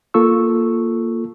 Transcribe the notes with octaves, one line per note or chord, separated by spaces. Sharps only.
A#3 F4 A4 C#6 E6